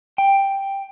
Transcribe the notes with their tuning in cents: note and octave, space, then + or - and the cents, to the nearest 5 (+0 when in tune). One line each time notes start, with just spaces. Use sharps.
G5 +5